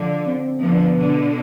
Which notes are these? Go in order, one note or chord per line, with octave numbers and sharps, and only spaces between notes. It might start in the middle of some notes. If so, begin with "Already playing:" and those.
Already playing: D3 F3
C4
D3 F3 B3
B2 D3